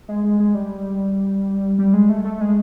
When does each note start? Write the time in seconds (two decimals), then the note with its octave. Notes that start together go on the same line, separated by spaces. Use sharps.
0.08 G#3
0.24 G#3
0.40 G#3
0.55 G3
1.79 G3
1.94 G#3
2.09 A3
2.24 A3
2.41 G#3